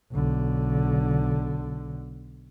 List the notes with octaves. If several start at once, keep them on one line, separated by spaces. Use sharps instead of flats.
B1 D3